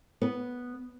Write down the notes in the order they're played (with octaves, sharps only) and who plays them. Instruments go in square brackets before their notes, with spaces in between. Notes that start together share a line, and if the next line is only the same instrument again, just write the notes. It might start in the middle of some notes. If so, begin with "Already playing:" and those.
[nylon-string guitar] B3